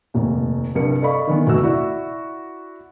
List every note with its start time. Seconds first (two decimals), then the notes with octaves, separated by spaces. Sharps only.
0.14 F1 D#2
0.75 C2 G2 A#4 C#7
1.02 A4 D5 D#5 F5 B5 C#6
1.27 D#3 E3 B3
1.47 F1 D2 F#4 E6
1.63 E4 F#4 D5